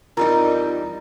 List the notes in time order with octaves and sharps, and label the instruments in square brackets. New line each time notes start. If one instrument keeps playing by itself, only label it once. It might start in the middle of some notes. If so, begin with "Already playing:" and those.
[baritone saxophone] F2 [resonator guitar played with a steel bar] E3 G3 D#4 [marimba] A#4 A#5